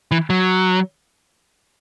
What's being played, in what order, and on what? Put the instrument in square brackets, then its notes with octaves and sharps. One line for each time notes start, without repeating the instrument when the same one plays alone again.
[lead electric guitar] E3
F#3